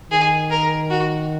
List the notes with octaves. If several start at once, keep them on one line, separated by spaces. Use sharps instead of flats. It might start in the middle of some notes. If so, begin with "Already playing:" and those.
D#3 G#4
A#4
F#4